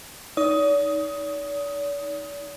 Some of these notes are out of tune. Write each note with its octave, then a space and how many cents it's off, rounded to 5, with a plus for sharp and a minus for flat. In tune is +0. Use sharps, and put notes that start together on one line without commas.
D#4 +15 D5 -45 D#6 +15